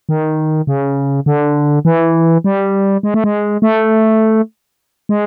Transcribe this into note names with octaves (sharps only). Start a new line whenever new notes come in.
D#3
C#3
D3
E3
G3
G#3
A3
G#3
A3
G#3